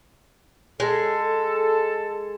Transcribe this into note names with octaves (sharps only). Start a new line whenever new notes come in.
G#3 A4